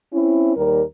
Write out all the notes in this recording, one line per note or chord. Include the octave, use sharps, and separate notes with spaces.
C4 C#4 E4
D#2 G3 A#4